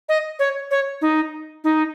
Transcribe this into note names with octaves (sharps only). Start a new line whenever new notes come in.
D#5
C#5
C#5
D#4
D#4